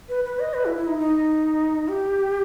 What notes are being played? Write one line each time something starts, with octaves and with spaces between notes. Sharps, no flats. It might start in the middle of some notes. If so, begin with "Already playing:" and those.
B4
B4
D#5
B4
E4
E4
D#4
D#4
G4